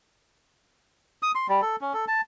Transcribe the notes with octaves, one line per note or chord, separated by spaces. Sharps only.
D#6
C6
G3
A4
C#4
A4
A5